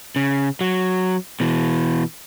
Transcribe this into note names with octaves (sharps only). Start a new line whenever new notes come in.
C#3
F#3
B2 E3